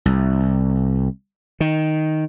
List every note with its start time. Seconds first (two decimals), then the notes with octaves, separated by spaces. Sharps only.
0.06 C2
1.60 D#3